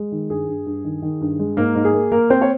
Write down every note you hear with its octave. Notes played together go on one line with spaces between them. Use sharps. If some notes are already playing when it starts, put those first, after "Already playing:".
Already playing: G#3
D#3
G2 G#4
G2
G2
D#3
D#3
G2
G#3
G#2 A#3 A#4
G#2
G#4
A#3
A#3 A#4
A#3 C4 C5
C#5